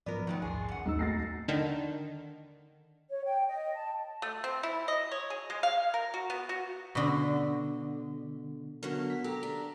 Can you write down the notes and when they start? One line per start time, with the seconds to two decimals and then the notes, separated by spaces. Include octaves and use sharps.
0.06 G#2 F3 F#3 B3 A#4 D5
0.27 A2 D#3 B3 F#5 C#6
0.42 A#1 D#2 G#2 G#4 A5 C6 C#6
0.69 F#2 F#5
0.86 D#2 G#2 A#3 G#4 E6
0.99 A3 A6 A#6 C7
1.48 D3 D#3
3.10 C#5
3.25 G5
3.49 D#5
3.75 A5
4.22 A3
4.44 C4
4.63 E4
4.88 D#5
5.11 C#5
5.30 G#4
5.50 G#3
5.63 F5
5.94 A#4
6.14 F#4
6.30 B3
6.49 F#4
6.95 B2 D3
8.83 D3 F#3 B3 A#4
9.10 B6
9.24 G4 A4 A#5
9.43 D4